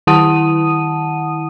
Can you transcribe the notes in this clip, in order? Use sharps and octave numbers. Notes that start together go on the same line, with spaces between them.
D#3 E4 F#5 A5 D#6 D#7